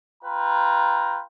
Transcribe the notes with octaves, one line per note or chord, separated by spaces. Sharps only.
F4 B4 G5 A#5